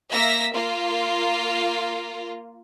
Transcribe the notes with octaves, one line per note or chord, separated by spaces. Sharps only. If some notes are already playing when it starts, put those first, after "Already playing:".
A#3 E5 E6 A#6 B6
A#3 F4